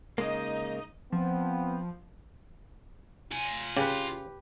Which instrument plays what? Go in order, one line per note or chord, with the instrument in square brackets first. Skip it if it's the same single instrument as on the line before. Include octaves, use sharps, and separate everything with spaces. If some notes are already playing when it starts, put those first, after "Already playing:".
[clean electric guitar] C#3 G#3 A#3 [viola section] D#4 D#5
[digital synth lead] F3 [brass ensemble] B3 C4
[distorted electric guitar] F4 G#5
[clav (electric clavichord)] C#3 [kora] G4 B4